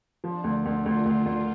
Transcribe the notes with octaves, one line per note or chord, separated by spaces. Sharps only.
F3 D4
D2
D2
D2 F4
D2
D2